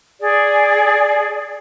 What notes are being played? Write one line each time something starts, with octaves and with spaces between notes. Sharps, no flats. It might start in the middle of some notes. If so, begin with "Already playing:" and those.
G#4 D5